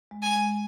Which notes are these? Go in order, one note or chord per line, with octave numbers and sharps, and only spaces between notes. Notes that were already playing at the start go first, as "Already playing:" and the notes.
G#3
G#5
G#3